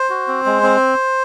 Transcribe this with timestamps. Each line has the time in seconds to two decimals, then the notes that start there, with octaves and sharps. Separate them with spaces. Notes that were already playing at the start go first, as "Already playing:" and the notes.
Already playing: C5
0.10 F#4
0.28 C4
0.46 G#3
0.63 C4